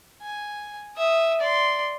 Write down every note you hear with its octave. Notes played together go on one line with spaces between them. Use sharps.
G#5
E5 D#6
D5 C6